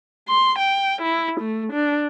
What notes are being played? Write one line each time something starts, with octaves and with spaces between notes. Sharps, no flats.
C6
G5
E4
A3
D4